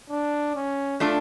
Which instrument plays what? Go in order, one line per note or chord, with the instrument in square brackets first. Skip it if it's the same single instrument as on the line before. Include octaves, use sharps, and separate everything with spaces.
[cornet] D4
C#4
[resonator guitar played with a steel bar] A3 D4 F4 A4